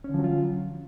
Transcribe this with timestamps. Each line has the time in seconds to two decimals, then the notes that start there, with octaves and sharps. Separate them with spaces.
0.04 C#4
0.09 D3
0.14 F3
0.19 F#3
0.24 F4